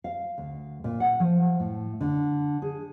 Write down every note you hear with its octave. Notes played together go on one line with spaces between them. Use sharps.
F5
D2
A#2
F#5
F3
A2
D3
G#4